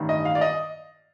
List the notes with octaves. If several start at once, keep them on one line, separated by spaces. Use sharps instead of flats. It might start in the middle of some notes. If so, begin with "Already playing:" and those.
Already playing: A1 G2 D#3
D#5
F5
D5
D#5